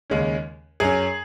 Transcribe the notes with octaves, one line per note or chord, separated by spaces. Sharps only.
D#2 C#3 G#3 C#4
F#2 F#3 C#4 G#4